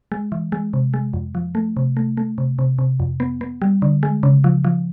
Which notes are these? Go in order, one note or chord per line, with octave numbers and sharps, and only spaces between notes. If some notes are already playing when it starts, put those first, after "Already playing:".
G#3
E3
G#3
C3
G#3
F2
F3
A3
C3
A3
A3
C3
C3
C3
F2
B3
B3
G3
D3
G#3
C#3
F3
F3